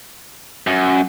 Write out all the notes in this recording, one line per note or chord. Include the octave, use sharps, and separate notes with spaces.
F#2